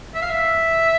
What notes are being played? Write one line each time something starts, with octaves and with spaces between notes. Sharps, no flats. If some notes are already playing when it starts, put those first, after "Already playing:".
E5
F5
E5